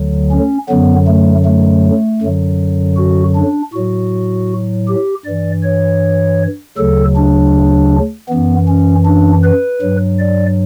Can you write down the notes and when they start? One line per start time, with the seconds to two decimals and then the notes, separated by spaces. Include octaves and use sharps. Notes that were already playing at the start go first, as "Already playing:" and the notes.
Already playing: D2 D3 F#3
0.31 C#4
0.69 F#2 D3 F#3 B3
1.08 A3
1.45 A3
2.21 F#2 D3 F#3
2.97 F#4
3.35 D4
3.73 A2 F#3 F#4
4.88 G4
5.25 G2 E3 D5
5.63 C#5
6.77 D2 C#3 F#3 A4
7.16 D4
8.29 F#2 E3 B3
8.68 C#4
9.06 D4
9.44 B4
9.82 G2 F#3
10.19 D5